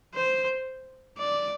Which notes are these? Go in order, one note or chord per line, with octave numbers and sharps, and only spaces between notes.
C5
D5